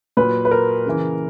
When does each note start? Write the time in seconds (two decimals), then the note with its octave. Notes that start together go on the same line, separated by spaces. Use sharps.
0.17 A#2 F#3 B4
0.45 B4
0.51 A#4
0.86 C#3 E3